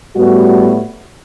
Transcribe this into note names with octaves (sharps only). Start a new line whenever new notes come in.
A2 G3 B3 F#4